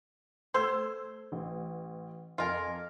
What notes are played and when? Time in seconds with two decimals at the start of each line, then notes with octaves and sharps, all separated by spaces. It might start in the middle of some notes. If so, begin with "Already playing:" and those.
0.54 A3 C5 E6 G#6
1.32 A1
2.38 F2 F4 A#4 G#5